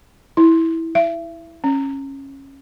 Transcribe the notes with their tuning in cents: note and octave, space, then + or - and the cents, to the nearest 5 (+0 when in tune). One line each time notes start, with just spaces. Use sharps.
E4 -10
E5 +35
C#4 -20